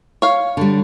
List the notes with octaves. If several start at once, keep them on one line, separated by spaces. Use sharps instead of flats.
C#5 F5
D3 G3